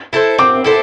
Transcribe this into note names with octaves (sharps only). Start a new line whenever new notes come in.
E4 A4 C5
C4 D6
E4 A4 C5